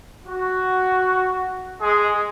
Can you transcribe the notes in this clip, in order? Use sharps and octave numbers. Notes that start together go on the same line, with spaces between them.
F#4
G#3 G#4